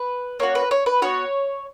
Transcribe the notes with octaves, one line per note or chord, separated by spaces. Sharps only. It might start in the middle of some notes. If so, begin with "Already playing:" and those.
Already playing: B4
A#3 C#4 F#4 C#5
B4
C#5
B4
B3 F#4 C#5